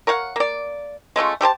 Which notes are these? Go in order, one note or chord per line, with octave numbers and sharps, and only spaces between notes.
A#4 C#5 F5 F#5
A#3 D5
G#3 A3 C#4 F4
A3 G4 C5 A5